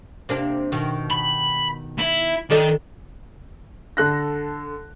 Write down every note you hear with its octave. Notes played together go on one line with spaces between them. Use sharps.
C3 A#3 D4
B2 D#3
B5
E4
D#3 D4 A4 D#5
D3 A4 F#6 A#6